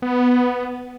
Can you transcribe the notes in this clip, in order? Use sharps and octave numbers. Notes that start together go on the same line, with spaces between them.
B3